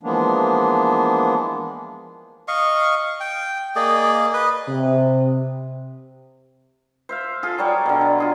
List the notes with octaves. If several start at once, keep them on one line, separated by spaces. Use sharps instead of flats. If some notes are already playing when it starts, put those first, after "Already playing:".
E3 F3 G#3 A#3 B3 D4
D#5 F5 C#6
G5
A#3 G#4 D5 D#5
B4 D#5
C3
C5 E5 F5
F4 G#4 A4
F#3 G3 C#5 D5
B2 D3
D3
F4 G#4 A#5